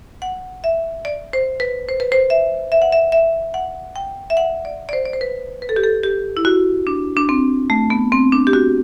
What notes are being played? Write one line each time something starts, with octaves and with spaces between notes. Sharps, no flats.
F#5
E5
D5
C5
B4
C5
B4
C5
E5
E5
F#5
E5
E5
F#5
G5
E5
F#5
D5
D5
C5
D5
C5
B4
B4
A4
G4
A4
G4
E4
F#4
D4
D4
C4
A3
B3
C4
D4
G4
F#4